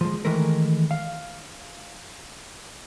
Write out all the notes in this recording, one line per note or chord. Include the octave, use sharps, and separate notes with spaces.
F3 G#3
D#3 E3 G#3 A3 A#4
F5